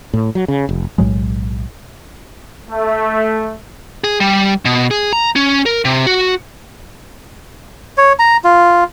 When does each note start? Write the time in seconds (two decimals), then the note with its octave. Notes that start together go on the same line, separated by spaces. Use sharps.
0.14 A2
0.35 F#3
0.48 C#3
0.69 F1
0.98 B1 A2 F#3 G#3
2.70 A3
4.04 G#4
4.20 G3
4.65 B2
4.91 G#4
5.13 A#5
5.36 C#4
5.66 A#4
5.85 C3
6.07 F#4
7.98 C#5
8.19 A#5
8.44 F4